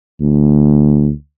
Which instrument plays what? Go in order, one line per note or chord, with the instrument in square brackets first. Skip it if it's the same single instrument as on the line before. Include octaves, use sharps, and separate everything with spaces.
[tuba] D2